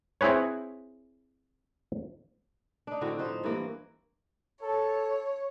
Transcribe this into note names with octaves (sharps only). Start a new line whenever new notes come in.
C4 E4 G#4 B4 C#5
D4 D#4
A2 D3 C4 F#4
F3 D#4 C5
G2 E3 A#3
A4 C#5